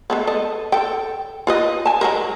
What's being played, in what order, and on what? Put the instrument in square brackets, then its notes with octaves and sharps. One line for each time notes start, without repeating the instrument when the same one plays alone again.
[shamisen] G#3 A3 B3
A4 D#5
A4 G5
F4 B4 D#5
G#5 A5
F#3 G#3 A#4